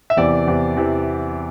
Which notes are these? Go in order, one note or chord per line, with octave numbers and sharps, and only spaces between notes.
E5
E2 C3 E3 D5
E2 C3 E3
C3 E3